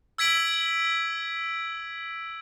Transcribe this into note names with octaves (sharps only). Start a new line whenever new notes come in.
E6 G#6 B6 D7 F#7